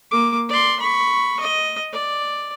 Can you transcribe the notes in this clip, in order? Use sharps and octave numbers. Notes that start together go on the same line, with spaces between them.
A#3 D6
D5 C6
B5 C#6
D#5
D5